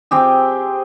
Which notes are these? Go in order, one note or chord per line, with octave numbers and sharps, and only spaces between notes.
C4 G4 G#4